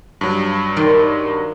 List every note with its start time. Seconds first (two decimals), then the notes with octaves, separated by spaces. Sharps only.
0.21 G2 F#3
0.76 D#3 D5 C6